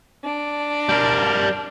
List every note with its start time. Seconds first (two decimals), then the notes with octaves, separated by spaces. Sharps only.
0.23 D4
0.89 G3 A#4